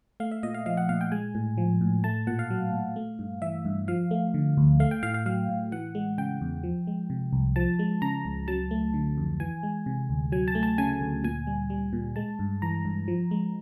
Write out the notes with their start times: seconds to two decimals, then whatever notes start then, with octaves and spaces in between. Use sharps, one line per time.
0.20 A3 F5
0.31 E5
0.43 A#2 D#5
0.54 F5
0.66 F3 F5
0.77 F#5
0.89 A#2 F5
1.01 G5
1.12 G#3 G#5
1.35 A2
1.58 F3
1.81 A2
2.04 A3 A5
2.27 A#2 F#5
2.39 F5
2.50 F#3
2.73 A#2
2.96 A3
3.19 G2
3.42 E3 E5
3.65 G2
3.88 F3 F5
4.11 A3
4.34 D3
4.57 D2
4.80 A3 F5
4.91 G5
5.03 A2 F5
5.14 F5
5.26 F#3 F5
5.49 A2
5.72 E3 F#5
5.95 G#3
6.18 C#3 G5
6.41 E2
6.63 F3
6.87 G#3
7.10 C3
7.33 C2
7.56 F3 A5
7.79 G#3
8.02 C#3 A#5
8.25 C#2
8.48 F#3 A5
8.71 A3
8.94 D3
9.17 F2
9.40 E3 G#5
9.63 G#3
9.86 C3
10.10 D2
10.32 F#3 G#5
10.48 A5
10.55 A3
10.63 A5
10.78 C#3 G#5
11.01 D2
11.24 A#2 G#5
11.47 G3
11.70 G3
11.93 A#2
12.16 G#3 A5
12.39 G2
12.62 E3 A#5
12.85 G2
13.08 F3
13.31 G#3